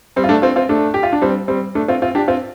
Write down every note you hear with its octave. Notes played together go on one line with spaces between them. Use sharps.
G3 C4
F4
A3 D4
C4 F4
C4 F4
A3 D4
G4
F4
D4
G3 C4
G3 C4
A3 D4
C4 F4
C4 F4
D4 G4
C4 F4